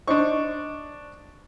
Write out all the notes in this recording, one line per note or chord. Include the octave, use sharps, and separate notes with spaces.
D4 D#4 C5 C#6